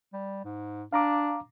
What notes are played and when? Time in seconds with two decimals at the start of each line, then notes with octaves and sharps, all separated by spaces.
0.13 G3
0.45 G#2
0.93 D4 F5 A#5 D6